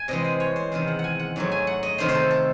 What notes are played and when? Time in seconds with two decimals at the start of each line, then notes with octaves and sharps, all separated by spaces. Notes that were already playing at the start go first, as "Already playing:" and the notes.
Already playing: G#5
0.08 C3 E3 G#3 D#5
0.24 C5
0.40 C#5
0.56 C5
0.72 E2 C3 D#3 C5
0.87 F#5
0.99 F#5
1.04 G#5
1.20 F#5
1.36 G#2 F#3 A3
1.52 G#5
1.67 F#5
1.83 D#5
1.98 C3 D#3 A3 C5
2.08 C5
2.15 A4
2.31 A4